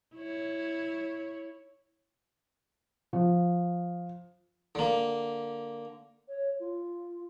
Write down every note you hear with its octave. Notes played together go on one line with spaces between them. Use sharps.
E4 C#5
F3
D3 A#3
C#5
F4